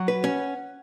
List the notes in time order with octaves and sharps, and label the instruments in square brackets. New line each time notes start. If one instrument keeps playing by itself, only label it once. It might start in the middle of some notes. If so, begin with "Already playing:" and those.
Already playing: [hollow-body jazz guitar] F#3 [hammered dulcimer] F#5
[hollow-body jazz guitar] B4
C#4